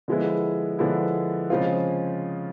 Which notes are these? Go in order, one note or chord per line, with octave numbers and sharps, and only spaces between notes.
D3 F3 G#3 B3 E4
D3 F3 G#3 B3 E4
C#3 F3 G#3 C4 F4